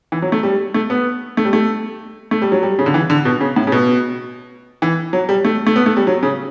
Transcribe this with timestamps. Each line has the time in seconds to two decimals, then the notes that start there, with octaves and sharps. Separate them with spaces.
0.12 E3
0.22 F#3
0.32 A3
0.43 G3
0.74 A3
0.90 B3
1.37 A3
1.45 G3
1.53 A3
2.31 A3
2.42 G3
2.52 F#3
2.63 G3
2.79 C#3
2.86 D3
2.94 E3
3.10 D3
3.25 B2
3.41 C#3
3.56 A2
3.67 C#3
3.72 B2
4.82 E3
5.13 F#3
5.29 G3
5.45 A3
5.67 A3
5.76 B3
5.86 A3
5.97 G3
6.07 F#3
6.23 C#3